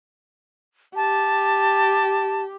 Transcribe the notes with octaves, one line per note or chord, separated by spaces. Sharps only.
G4 A5